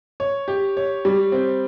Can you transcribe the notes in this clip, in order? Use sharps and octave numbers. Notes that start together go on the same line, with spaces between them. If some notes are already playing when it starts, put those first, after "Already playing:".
C#5
G4
C#5
G3
C4